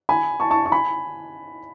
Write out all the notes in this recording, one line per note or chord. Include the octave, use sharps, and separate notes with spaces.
G#5 B5
A5 C#6
A5 C#6
C#6
G#5 B5